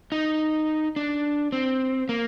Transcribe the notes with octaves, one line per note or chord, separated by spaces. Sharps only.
D#4
D4
C4
A#3